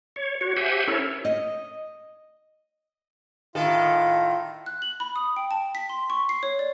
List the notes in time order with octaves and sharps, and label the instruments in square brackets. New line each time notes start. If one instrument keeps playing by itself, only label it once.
[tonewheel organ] C#5
F#4 C#5
G4 C5 E5 F#5 G#5
C#4 E4 A4 A#4 C#5
[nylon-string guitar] D#5
[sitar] A2 D#3 A4 [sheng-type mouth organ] F4
[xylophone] F#6
F#7
B5
D#6
G5
A5
B6
C6
C#6
C7
C#5
D5